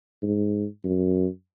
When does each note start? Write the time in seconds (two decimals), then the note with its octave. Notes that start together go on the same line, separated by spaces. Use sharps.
0.23 G#2
0.84 F#2